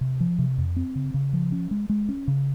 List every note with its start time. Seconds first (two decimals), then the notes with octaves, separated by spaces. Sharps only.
0.01 C3
0.20 F3
0.39 C3
0.58 F2
0.76 C4
0.95 C#3
1.14 C#3
1.33 F3
1.52 C#4
1.71 G#3
1.89 G#3
2.09 C#4
2.28 C#3